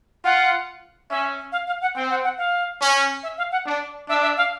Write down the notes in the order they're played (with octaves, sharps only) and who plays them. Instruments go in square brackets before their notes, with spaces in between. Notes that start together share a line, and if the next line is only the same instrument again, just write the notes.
[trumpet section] F4 [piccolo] F#5
[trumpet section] C#4 [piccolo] E5
[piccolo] F5
F5
F#5
[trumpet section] C4 [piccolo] G5
[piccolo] F#5
F#5
F5
[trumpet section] C#4
[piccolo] E5
F5
F#5
[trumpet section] D4
[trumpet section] D4 [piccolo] E5
[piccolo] E5
F5